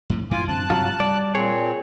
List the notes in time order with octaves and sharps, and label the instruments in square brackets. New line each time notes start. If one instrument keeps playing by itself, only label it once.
[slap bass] F2 A2
[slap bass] F#2 A2 E3 [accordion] F4 G#5 D6
[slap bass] F#2 D3 C4 [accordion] A5 F#6
[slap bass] G2 C3 [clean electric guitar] F#3 F4
[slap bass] G3 [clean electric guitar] D5
[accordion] A#2 C4 [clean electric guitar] G#4 C#5